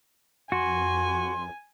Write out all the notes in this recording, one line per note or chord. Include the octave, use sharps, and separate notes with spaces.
F2 F#4 G#5 C6